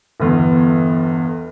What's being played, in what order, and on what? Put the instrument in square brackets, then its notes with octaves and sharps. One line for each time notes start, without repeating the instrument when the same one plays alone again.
[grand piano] G1 E2